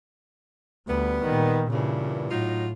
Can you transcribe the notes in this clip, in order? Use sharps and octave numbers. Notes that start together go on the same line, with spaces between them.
D2 G3 B3
A#2 D#3
G2 A#2 C#3 E3
A2 F#3 D#4 F4